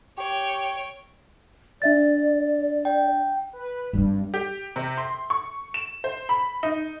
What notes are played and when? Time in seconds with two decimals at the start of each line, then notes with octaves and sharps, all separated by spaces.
0.18 G4 C#5 G5
1.82 D4 D5 E5 A6
2.85 G5
3.53 B4
3.93 G2 G3 C4
4.34 G4
4.76 C3
4.98 C6
5.30 C#6
5.74 E7
6.04 C5
6.29 B5
6.63 D#4